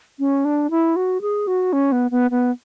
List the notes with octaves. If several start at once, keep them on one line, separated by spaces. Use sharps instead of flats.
C#4
D4
E4
F#4
G#4
F#4
C#4
B3
B3
B3